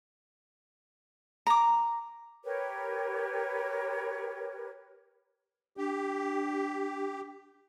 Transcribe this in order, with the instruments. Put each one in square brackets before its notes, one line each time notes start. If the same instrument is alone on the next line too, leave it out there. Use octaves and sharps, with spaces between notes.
[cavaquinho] A#5 D6
[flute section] G4 A#4 B4 C#5
[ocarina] D4 [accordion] G4